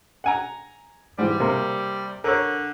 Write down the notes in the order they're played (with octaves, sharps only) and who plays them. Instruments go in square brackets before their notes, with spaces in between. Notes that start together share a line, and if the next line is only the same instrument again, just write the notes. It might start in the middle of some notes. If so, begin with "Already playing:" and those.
[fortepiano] F#5 G#5 A#5
[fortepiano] G#2 E3 [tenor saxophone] G3
[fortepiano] C3 A#3
[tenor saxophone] D3 [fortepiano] A#4 C#5